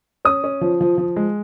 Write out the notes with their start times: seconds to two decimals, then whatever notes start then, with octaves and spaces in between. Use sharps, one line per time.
0.25 C#4 D#6
0.44 C#4
0.61 F3
0.81 F3
0.98 F3
1.16 G#3